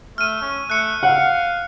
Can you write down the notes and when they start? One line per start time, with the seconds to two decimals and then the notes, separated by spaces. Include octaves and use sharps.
0.18 A3 F6 D#7
0.41 C#4
0.70 A3 F#6 C#7
1.03 F5 F#5